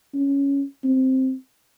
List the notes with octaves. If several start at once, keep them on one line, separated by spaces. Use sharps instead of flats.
C#4
C4